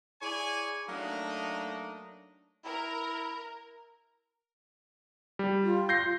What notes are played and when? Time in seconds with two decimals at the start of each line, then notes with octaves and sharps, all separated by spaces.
0.22 E4 G#4 C#5 D5 G#5
0.89 F#3 A3 A#3 D4 D#4 D#5
2.65 E4 A#4
5.39 G3
5.63 F4
5.89 G6 A#6 C7